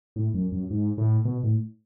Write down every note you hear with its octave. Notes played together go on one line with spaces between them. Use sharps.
A2
F#2
F#2
G#2
A2
B2
A2